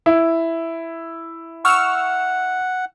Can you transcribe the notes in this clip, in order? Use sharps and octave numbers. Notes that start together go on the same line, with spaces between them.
E4
F#5 C#6 E6 F6